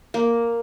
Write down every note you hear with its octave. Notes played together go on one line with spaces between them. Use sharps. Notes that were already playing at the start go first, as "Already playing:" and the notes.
A#3